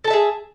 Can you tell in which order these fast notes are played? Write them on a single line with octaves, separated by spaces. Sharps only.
A4 A5 E5 G#4